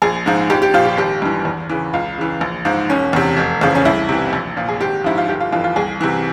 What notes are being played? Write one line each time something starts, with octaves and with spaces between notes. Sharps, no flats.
A#1 G#4
G#2 F3
A#1 G4
G4
A#2 F3 F4
G4
G#1 G4
G2 E3
E2
C#3 E3
C#2 F4
C#3 E3
A#1
G#2 F3
E1 C#4
E2 C3
F1
E2 C#3 F3
C#4
C2 E4
C3 E3
A#1
A#2 F3
G#4
G#1 G4
G#2 F3 E4
F4
G1 G4
F4
F2 E3 F4
F4
C2 G#4
C3 E3